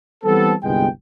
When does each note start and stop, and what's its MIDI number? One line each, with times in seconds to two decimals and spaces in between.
0.24 0.53 52
0.24 0.53 55
0.24 0.53 59
0.24 0.53 60
0.24 0.53 69
0.63 0.87 31
0.63 0.87 36
0.63 0.87 56
0.63 0.87 59
0.63 0.87 79